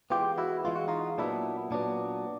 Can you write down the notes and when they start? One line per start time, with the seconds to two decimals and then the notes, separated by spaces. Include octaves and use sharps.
0.10 E3 G#3 B3 F4 G4
0.38 E4 F#4
0.64 E3 G#3 B3 F4
0.75 F#4
0.88 D#4 F4
1.18 A#2 F#3 B3 D4 E4
1.71 A#2 F#3 B3 D4